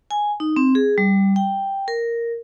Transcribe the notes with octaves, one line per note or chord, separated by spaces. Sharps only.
G#5
D#4
C4
G#4
G3
G5
A#4